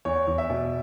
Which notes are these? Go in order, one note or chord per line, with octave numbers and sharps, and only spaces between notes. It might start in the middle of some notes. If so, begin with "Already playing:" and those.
E2 C#5
E2
E5
B2